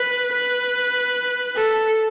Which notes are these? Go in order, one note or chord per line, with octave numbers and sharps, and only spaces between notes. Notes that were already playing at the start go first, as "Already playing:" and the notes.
Already playing: B4
B4
A4